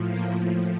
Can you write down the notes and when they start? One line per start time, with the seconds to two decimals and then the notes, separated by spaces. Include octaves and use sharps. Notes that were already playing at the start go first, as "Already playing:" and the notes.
Already playing: A2 F3
0.09 A#3